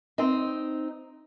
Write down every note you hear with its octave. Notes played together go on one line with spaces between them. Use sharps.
C4 D#4